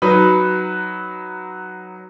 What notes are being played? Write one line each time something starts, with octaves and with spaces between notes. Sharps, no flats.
F#3 D#4 B4